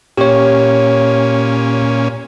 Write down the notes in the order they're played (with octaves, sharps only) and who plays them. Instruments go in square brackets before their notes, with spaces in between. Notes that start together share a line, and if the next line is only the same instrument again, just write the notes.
[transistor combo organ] A#2 C#4 [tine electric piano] G4 C#5